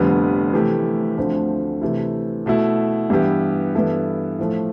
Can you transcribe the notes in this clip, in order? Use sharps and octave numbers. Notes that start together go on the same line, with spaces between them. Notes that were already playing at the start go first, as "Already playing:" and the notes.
Already playing: F1 F2 D3 G3 B3
C3 E3 A3 E4 G4
D2 D3 F3 A3 C4
C3 E3 A3 E4
B2 A3 E4
G2 E3 B3 E4 G4
G2 E3 B3 E4 A4
A2 F3 A3